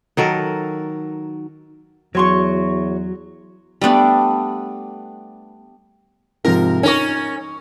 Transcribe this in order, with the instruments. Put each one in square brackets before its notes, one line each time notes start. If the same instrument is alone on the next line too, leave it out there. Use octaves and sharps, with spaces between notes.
[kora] D#3 F#3 A4 A#4
[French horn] E2 [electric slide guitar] F#3 [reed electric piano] F#4 [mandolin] C#5 C6 C#6
[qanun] G3 A3 B3 D4
[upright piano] G#2 C3 F3 [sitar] A#4
[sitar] C#4 A#4 [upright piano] D#4 C#6